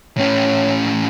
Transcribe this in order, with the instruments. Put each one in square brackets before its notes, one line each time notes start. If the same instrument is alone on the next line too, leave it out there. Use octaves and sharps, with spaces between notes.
[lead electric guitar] A2 C#4 [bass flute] C#5